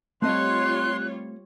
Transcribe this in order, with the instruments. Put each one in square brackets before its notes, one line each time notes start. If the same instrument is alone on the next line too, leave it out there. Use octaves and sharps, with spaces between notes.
[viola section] G3 F4 C#5 [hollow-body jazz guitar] A3 C4 D#5 [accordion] C6 [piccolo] F#6